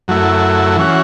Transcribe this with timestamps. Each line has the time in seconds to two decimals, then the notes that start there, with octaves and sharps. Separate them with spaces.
0.08 F#2 F#3 A3 E4
0.76 E3 C#4 F#4